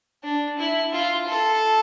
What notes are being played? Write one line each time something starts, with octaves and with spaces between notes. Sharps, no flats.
D4
E4
F4
A4